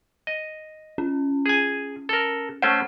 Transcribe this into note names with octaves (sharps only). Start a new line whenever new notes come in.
D#5
C#4
G#4 G#5
A4 A#4
A3 C#4 C5 F#5